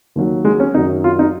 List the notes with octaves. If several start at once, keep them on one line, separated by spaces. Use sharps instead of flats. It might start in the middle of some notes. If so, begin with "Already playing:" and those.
D#2 D#3 F#3
G#3
C#4
F#2 D#3 F#3 D#4
F4
D#4